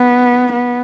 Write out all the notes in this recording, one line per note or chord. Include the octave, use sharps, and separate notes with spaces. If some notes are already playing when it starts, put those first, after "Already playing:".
Already playing: B3
B3